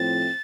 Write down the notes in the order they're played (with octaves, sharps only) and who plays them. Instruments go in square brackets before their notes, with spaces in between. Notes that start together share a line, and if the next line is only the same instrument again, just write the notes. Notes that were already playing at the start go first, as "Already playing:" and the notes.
Already playing: [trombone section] A2 F3 A3 C4 [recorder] A6